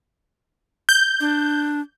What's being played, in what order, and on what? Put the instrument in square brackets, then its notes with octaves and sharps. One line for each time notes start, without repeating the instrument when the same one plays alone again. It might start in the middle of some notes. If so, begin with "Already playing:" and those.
[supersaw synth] G6
[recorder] D4